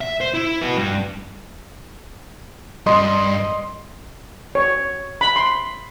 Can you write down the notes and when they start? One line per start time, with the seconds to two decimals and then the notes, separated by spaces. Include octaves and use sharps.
0.01 E5
0.21 C5
0.34 E4
0.61 F#4 B4
0.77 G2 G3
2.86 G2 D#5 C6
4.55 C#5
5.21 B5
5.36 C6